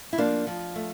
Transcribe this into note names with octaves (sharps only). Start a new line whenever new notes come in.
E4
F3 A#3 D4
F3
A3